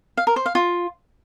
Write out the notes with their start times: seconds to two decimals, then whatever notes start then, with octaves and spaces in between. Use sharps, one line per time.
0.17 F5
0.27 A#4
0.36 C5
0.46 F5
0.55 F4